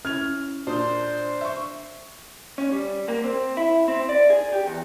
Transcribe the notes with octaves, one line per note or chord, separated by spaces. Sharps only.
C#4 E4 F6 G#6 F7
A#2 D4 C5 D#6
E5 C#6
C#4
G3
A#3
C4
E4
C4
D5
G#4
G4
E2